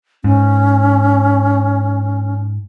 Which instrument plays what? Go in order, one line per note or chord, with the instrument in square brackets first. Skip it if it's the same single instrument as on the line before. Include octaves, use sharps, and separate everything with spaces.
[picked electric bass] G#2 [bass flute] C#4